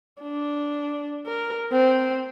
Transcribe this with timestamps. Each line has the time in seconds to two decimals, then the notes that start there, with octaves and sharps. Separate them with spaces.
0.22 D4
1.26 A#4
1.72 C4